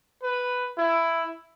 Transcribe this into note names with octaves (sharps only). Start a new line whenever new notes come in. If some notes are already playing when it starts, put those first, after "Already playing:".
B4
E4